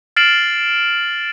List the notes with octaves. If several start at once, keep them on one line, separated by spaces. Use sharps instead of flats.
F6 A6 C7 D7 E7 F#7